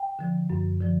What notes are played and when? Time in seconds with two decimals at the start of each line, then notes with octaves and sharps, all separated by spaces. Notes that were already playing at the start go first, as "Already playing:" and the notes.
Already playing: G5
0.19 D3 F3
0.50 F#2
0.81 D3 F3